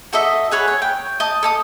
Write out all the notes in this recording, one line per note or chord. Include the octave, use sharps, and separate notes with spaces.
F#4 A4 D#5 E5
G#4 B4 C#5 F#5
C#5
G5
D#5 A5
A4 A5 D#6